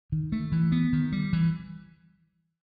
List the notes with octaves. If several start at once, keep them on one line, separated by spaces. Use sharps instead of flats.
D#3
A3
E3
B3
D#3
G3
E3